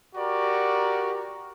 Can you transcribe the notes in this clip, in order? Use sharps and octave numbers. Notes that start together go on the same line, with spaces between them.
F#4 G4 A#4 D5